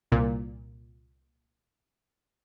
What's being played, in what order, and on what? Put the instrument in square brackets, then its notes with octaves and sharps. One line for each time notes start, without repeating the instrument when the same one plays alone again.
[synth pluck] C2 A#2